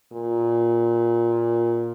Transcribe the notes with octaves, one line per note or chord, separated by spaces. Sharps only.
A#2